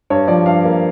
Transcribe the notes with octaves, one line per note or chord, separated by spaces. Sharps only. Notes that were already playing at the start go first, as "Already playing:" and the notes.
G2 C#5
F3 D5
G2 F5
A#3